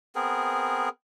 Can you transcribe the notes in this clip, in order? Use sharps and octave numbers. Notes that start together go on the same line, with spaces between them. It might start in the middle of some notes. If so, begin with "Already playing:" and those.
B3 C4 G#4 A#4